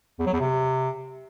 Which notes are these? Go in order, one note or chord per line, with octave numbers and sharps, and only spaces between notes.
E2
F#3
E2
C3